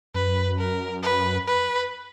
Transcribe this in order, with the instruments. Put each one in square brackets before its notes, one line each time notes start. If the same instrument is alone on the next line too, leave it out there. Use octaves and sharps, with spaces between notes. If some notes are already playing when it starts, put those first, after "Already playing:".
[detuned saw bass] F#2 [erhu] B4
[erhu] A#4
B4
B4